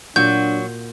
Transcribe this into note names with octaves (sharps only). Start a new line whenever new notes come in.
A#2 F#3 D4 F#4 G6